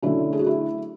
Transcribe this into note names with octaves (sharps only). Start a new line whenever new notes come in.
D3 F#3 A3 C#4 E4
G#4
F#4
E4